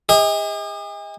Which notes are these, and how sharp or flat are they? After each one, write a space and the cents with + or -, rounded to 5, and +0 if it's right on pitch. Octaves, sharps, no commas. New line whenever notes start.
G#4 -45 D#5 +35